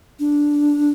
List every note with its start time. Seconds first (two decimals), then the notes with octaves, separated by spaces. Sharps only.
0.20 D4